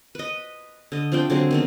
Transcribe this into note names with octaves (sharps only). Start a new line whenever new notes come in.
B4 D#5
D3 D#5
F3 C4 D4 G5
D3 F#3 G#3 C4
D#3 B3 C4